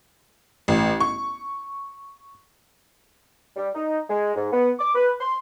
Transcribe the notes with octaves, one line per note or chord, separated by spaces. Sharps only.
A1
C#6
G3
D#4
G#3
G#2
B3
D6
B4
C6